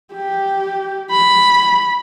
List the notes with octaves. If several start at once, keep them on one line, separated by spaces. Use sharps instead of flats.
G4
B5